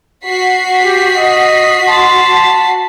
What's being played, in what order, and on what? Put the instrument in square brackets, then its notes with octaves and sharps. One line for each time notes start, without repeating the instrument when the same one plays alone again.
[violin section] F#4 B6 C7
[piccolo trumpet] G4
D#5
[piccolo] A5 [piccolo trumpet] C6